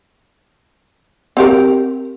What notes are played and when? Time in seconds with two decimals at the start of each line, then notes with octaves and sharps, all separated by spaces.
1.37 C4 G4 A#4